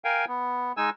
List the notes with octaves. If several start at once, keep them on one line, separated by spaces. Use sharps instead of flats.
A#4 F5 G5 G#5
B3
G#3 D#4 G#5 E6